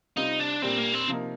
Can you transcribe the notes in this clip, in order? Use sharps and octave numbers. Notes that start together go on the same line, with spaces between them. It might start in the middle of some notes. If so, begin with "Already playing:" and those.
C3 G3 C4 D#4 F4
D4
A#2 G3 C4 D4 G4 A#4
A#3
C4
C3 F3 A#3 D#4 A#4